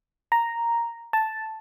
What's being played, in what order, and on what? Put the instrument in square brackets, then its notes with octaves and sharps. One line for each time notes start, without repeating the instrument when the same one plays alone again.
[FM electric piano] A#5
A5